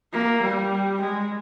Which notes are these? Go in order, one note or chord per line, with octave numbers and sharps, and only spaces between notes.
A#3
G3
G#3